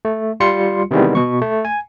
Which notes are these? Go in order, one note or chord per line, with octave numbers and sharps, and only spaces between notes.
A3
G3 F4 C6 C#7
C3 D#3 E3 G3 G#3 B3
B2 C#6
A3
G#5